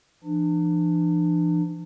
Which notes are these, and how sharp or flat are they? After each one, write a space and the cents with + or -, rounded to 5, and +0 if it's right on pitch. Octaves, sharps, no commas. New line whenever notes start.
E3 +45 D4 +35